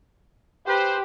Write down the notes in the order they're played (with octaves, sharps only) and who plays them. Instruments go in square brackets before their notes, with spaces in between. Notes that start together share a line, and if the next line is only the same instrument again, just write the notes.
[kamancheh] G4 [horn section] B4 C5